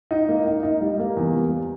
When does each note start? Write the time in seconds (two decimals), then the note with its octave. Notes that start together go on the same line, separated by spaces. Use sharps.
0.11 D#4
0.29 A#3
0.46 D#4
0.63 D#4
0.81 G3
0.99 A#3
1.16 E2
1.34 G3